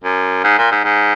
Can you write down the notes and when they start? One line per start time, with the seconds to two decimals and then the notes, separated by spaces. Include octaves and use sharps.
0.04 F#2
0.44 G#2
0.58 A#2
0.71 G#2
0.84 G#2